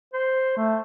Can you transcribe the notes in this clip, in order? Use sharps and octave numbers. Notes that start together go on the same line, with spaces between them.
C5
A3